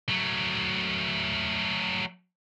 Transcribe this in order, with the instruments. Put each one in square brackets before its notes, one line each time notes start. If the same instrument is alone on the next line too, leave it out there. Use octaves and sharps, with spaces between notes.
[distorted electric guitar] F#3 A3